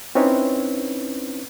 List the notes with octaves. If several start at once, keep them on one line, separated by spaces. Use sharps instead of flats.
C4 C#4 D#4 E4 B4 C#5